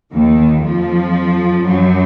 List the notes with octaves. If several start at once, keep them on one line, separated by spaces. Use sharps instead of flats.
D#2 D#3
F2 F3
F#2 F#3